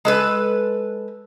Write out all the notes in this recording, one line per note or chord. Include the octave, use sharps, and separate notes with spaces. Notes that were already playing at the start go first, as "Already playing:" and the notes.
G#3 A4 B4